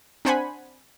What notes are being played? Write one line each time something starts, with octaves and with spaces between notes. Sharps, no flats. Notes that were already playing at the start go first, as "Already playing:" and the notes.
C4 D4 C5 F#5 G#5 B5